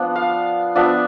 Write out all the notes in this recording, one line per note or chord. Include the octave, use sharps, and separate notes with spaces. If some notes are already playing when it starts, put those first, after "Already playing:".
Already playing: F3 B3 D4
F5
F3 B3 D4 E5